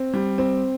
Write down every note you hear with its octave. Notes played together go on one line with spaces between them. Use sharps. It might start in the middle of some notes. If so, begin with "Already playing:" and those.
Already playing: C4
G3
C4